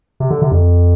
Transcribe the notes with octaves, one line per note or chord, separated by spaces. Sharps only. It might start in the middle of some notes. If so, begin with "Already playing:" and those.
C3
D3
C3
F2